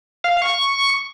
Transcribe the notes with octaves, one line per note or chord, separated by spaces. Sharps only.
F5
C#6